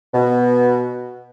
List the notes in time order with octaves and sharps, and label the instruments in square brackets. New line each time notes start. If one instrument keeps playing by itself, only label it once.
[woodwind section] B2